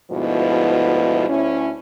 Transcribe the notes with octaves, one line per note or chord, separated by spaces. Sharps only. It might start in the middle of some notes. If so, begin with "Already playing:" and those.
D2 G#2 B2 F3 B3 E4
D2 C#4 E4